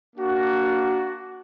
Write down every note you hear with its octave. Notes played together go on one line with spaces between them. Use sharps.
A#3 D4 F#4